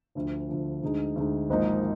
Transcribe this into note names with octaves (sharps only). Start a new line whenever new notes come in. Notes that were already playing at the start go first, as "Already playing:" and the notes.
D2 D3 F3
D2 D3 F3
D2 D3 G#3 D#4
D2 D3 G#3 D#4
G#1 G#2 F3 A#3 D#4